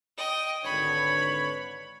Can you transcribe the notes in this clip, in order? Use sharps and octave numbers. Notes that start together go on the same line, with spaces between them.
D#5 G5
G#1 D3 B4 C#5 B5